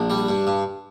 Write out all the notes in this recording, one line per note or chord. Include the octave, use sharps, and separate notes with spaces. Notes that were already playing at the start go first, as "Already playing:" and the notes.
Already playing: A#1 D4
G3
G2
G2